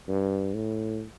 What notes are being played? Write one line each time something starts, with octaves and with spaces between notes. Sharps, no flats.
G2
A2